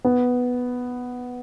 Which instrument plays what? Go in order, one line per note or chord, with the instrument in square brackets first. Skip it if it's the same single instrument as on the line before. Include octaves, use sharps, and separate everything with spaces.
[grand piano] B3